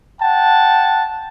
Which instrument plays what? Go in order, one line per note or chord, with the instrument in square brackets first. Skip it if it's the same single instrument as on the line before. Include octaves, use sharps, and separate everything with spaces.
[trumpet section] F#5 G5 A5